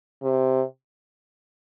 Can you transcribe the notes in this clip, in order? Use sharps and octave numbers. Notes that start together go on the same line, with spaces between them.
C3